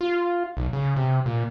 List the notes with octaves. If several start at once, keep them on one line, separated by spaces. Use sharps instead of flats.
F4
B1
C#3
C3
A#2